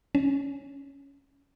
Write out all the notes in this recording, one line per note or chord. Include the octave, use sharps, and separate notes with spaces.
C#4